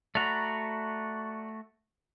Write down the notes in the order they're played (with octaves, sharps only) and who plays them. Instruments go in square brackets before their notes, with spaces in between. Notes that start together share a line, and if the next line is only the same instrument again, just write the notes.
[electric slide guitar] A3 F#4 [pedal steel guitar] D5 A#5 B5